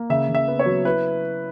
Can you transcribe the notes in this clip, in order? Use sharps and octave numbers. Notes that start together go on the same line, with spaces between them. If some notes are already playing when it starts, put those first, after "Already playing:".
Already playing: A#3
C#3 E5
C#3
E5
B3
C#5
F#3
E4 B4